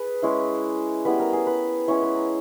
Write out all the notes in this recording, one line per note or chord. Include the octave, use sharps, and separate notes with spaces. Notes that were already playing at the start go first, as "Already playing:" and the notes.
Already playing: G#4 B4
G#3 C#4 E4
G3 B3 E4 B4
A#4
G#4
B4
G#3 C#4 E4 C#5
B4
A#5